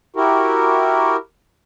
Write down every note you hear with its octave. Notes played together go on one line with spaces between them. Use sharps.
E4 F#4 G4 A#4